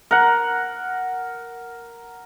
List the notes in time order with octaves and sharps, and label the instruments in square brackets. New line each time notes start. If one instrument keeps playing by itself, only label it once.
[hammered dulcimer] A#4 F#5